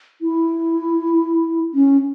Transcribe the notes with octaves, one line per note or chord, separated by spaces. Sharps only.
E4
C#4